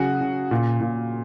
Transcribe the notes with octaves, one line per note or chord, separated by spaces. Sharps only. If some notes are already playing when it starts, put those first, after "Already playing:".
Already playing: C#3 F#3 F#4 G#4
C#3
A#2
A#2